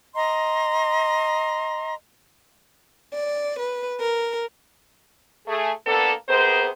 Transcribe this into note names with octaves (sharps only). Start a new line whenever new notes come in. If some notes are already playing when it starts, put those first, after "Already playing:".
D#5 A#5 C6
D5
B4
A#4
A3 G#4
A#3 B3 D4 A4
C3 B3 G#4 A#4 C5